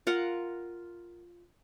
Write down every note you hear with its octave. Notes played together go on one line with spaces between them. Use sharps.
F4 A#4 F5 F#5